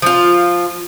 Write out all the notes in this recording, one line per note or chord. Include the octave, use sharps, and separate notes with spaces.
F3 F4